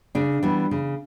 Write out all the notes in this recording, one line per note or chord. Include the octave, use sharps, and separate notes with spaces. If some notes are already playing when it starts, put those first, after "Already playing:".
C#3 D4
E3 G3 B3
C#3